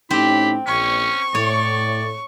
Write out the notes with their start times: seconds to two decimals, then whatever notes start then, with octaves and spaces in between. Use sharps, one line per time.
0.11 A2 C4 C#4 D#4 G4 B5
0.67 A#1 C#4 C#6
1.35 A2 C#5 D5